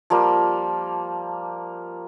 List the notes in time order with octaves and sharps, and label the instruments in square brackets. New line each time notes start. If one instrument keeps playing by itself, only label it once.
[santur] F3 G3 A#3